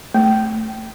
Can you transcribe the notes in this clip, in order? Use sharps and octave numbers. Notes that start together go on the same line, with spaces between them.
A3